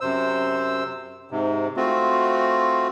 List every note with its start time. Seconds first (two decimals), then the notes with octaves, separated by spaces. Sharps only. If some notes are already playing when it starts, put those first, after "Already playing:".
0.01 F#2 C3 C5 E6
1.31 G#2 C3
1.77 A3 C4 F4 F#4